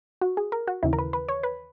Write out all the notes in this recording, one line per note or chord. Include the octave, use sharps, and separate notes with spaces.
F#4
G#4
A#4
F#4
D#2 C#3 E3 E4
A#4
B4
B4
C#5
B4